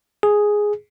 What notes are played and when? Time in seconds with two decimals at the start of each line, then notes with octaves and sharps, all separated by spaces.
0.23 G#4